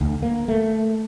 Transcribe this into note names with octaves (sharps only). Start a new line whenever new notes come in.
D2
A#3
A3